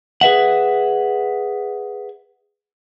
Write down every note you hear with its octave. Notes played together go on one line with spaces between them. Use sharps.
G#4 B4 E5 F#5